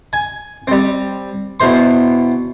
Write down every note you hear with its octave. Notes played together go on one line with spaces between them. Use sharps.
G#5
G3 C4
E2 B2 C5 C6